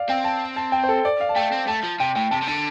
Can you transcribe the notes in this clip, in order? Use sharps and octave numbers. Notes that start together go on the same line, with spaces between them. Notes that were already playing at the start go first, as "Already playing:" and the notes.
Already playing: D5 F5
C4 G5
A5
A5
G5
C5
A4
D5
F5
A5
A3 G5
C4
A3 A5
F3
C3 G5
A2 G5
C3 A5
C3
D3 A5